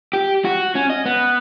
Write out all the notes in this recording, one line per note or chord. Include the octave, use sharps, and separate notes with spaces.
G4
F#4
C#4
D#5
B3